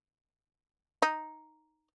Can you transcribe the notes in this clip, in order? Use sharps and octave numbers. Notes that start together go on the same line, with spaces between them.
D#4